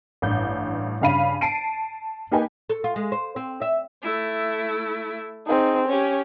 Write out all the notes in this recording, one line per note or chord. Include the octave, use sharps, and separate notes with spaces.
A1 G2 G6
G2 C#3 F5 B5 D#7
A5 C7 D7 D#7
A#3 D#4 G4 B4 G5 G#5
A4
F4
G#3
C5
C4
E5
A3 E4
C4 D#4 G#4
C#4 G4 C#5